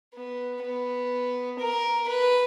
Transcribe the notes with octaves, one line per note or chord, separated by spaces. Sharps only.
B3
B3
A#4
B4